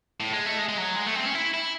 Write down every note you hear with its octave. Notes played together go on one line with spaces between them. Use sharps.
A2
G#3
A3
G#3
G#3
F#3
G#3
A3
C4
C#4
E4
E4